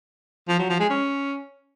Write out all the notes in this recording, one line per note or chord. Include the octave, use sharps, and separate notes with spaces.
F3
F#3
F3
G#3
C#4